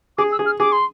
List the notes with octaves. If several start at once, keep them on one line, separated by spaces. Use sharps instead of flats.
G#4 D6
E6
G#4
F6
G#4 D6
C6